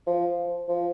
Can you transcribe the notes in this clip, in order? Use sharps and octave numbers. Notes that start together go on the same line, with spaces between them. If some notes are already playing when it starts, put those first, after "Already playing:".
F3
F3